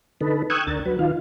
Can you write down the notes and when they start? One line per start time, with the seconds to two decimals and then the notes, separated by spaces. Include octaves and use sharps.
0.21 D3 D#4 A4 B4
0.50 G5 C#6 D#6 E6 F#6 G#6
0.67 D2 D4 A#4 A6
0.86 F#3 B4
0.99 D#3 F4 F5